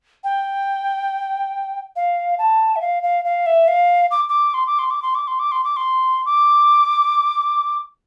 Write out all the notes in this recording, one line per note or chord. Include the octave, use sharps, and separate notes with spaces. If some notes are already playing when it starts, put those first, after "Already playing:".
G5
F5
A5
E5
F5
F5
F5
E5
F5
D6
D6
C6
D6
C6
D6
C6
D6
C6
D6
C6
D6
C6
D6